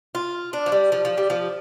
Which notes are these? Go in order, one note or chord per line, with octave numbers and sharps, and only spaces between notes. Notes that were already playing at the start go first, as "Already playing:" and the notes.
F4
D4
F3
G3
F3
F3
G3
F3